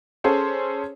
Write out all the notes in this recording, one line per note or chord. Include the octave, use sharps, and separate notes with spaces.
C#4 G#4 A4 C5 C#5